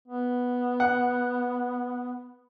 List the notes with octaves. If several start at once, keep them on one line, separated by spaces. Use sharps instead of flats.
B3
F#5